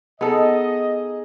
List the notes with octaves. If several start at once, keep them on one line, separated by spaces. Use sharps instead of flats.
B3 D#4 G#4 A4 D#5